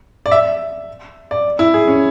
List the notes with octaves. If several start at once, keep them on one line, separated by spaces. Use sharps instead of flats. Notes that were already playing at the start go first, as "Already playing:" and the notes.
D5
E5
D5
E4
G#4
C#4